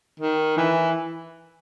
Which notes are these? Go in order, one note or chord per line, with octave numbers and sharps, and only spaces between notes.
D#3
E3